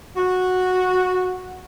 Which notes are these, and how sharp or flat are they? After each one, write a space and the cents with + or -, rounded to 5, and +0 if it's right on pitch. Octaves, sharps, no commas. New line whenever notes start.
F#4 -10